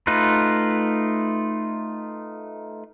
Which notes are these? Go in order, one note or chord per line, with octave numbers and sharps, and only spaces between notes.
A3 D#4 F4 B4